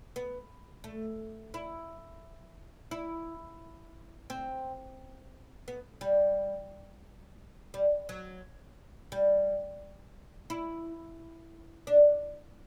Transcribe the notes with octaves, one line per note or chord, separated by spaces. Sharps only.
B3
A3
E4
E4
C4
B3
G3
G3
F#3
G3
E4
D4